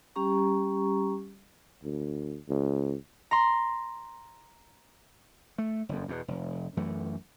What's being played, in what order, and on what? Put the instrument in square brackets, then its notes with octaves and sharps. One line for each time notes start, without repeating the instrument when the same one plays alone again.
[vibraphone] G3 C#4 G4 A#5 C#6
[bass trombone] D2
C#2
[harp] A#5 C6
[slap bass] A3
F#1 F2
E2 B2
F1
F#2 E3 A3